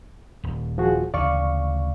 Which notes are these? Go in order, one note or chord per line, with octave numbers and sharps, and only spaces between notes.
D#1
F3 F#4 G#4
D2 C#3 E3 D5 F5 C#6